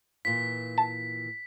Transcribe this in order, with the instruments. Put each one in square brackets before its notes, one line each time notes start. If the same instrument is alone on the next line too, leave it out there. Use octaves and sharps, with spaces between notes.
[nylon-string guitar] A#2 E3 F4 [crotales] B6
[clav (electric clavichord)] A5